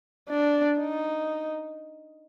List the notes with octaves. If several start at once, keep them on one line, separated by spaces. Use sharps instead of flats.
D4
D#4